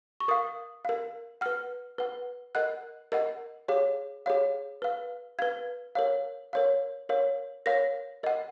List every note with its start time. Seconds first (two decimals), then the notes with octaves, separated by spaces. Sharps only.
0.20 C#6
0.28 A#4 F5 D#6
0.85 A#4 F5
1.41 B4 F#5 F6
1.98 B4 F#5
2.55 A#4 D#5 F#5 F#6
3.12 A#4 D#5 F#5
3.68 G#4 C#5 F5
4.26 G#4 C#5 F5
4.82 B4 F5
5.39 B4 F5 G#6
5.95 A#4 C#5 F5
6.53 A#4 C#5 F5
7.09 A#4 C#5 F5
7.66 A#4 C#5 F5 A#6
8.23 A#4 D#5 F#5